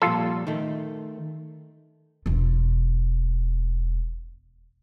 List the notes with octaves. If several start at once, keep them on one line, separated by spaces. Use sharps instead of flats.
A#2 F3 G3 F4 A4
D#3 A3
E1 F4